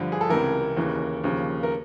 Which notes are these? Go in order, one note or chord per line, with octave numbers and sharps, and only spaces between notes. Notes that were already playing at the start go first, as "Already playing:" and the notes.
Already playing: G2 D3 F3
G#4
A4
C#2 C3 E3 A#4
D#2 C#3 E3
D#2 C#3 F3
A#4